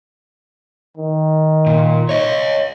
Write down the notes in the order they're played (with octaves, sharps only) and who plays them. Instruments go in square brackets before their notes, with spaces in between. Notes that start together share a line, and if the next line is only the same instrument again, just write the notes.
[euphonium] D#3
[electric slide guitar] A#2
C#5 D#5